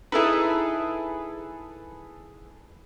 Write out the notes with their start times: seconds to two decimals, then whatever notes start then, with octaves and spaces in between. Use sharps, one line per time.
0.12 D#4 E4 G#4 A4 B4